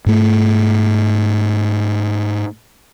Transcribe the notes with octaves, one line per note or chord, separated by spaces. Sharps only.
G#2 A3